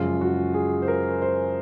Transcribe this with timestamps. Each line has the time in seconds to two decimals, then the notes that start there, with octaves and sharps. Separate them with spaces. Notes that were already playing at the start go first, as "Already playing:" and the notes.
Already playing: F#2 C#3 F3 G#3 F4
0.21 F#4
0.54 G#4
0.82 C5
0.88 A#4
1.22 C5